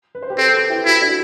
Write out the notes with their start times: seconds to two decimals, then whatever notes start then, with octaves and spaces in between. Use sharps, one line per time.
0.15 B4
0.23 C5
0.30 G4 B4
0.38 C4 A4 C5
0.54 G4 B4
0.70 E4 G4
0.85 E4 F#4 A4
1.01 D4 F#4